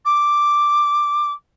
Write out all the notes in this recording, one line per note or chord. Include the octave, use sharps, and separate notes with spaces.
D6